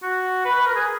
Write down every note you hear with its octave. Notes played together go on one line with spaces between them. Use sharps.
F#4
B4
B4
A#4
G#4